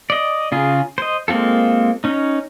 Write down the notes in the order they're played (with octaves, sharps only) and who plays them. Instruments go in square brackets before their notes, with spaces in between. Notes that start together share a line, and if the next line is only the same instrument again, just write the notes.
[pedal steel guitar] D5 D#5
C#3 F4 G#4
C5 D#5
G#3 A#3 C4 F4 A4
C#4 D#4